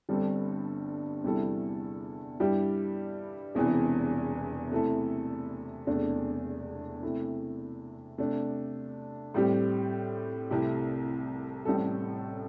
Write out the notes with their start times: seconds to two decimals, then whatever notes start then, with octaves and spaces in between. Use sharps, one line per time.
0.09 G1 G2 G3 C4 A4
1.24 E2 C3 G3 E4 A4
2.40 G2 G3 E4 G4
3.55 E1 E2 C3 E3
4.72 C3 A3 E4 A4
5.87 E1 E2 C3 A3 D4
7.03 C3 A3 E4
8.18 C3 A3 D4
9.34 A2 G3 C4 G4
10.51 C2 C3 A3 E4 G4
11.65 A1 A2 G3 C4 A4